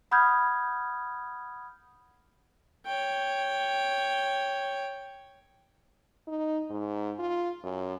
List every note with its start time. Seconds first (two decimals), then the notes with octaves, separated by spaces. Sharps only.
0.11 F#5 B5 D#6 F6 G6 G#6
2.86 C#5 G5
6.27 D#4
6.70 G#2
7.19 F4
7.63 F#2